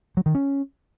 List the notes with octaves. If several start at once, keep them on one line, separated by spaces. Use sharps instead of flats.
F#3
D#3
C#4